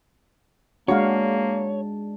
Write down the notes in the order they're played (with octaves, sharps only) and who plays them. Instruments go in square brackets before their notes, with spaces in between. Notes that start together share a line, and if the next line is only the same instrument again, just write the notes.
[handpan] G#3 D4 [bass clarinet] A#3 [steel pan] F#4 F5 [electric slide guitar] C#5